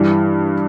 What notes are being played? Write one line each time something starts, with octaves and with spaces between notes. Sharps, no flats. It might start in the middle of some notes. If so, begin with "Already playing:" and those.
Already playing: G2 E3 G3